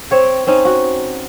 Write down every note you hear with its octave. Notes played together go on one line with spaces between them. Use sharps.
C4 C#5 G5
C4 C#4 D#4
F#4